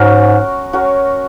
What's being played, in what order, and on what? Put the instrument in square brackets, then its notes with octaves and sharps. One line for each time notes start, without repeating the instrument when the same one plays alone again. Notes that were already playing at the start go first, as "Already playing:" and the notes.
Already playing: [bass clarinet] G#2 [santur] C#4 F#4 A#4
[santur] C#4 F#4 A#4